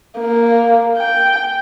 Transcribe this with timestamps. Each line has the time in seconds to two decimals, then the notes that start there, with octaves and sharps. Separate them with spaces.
0.19 A#3
0.98 G5